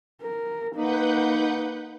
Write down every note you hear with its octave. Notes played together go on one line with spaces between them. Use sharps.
A#4
A#3 D#4 B4 F#5 G6